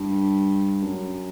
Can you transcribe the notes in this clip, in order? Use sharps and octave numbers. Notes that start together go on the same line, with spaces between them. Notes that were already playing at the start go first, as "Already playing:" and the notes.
Already playing: G2
F#2